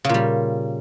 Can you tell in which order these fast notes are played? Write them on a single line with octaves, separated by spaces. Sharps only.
C#3 A#2 G3